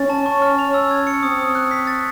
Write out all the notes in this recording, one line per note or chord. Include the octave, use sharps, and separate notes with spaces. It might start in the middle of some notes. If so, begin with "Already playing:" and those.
Already playing: C#4 A6
A5
C#6
F6
F7
E6
G#6
C#7
C4 D#6
D#6
F#6
B6
A6